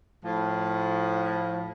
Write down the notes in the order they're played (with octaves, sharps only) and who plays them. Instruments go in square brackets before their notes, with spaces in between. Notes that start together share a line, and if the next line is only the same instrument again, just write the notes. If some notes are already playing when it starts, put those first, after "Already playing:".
[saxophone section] A2 F3